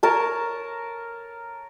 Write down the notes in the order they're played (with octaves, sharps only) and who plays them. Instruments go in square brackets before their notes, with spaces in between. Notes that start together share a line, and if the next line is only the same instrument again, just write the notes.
[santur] A#4 C#5 A5